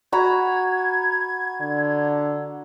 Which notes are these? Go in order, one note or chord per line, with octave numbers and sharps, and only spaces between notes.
F#4 A#5 B5 G#6
D3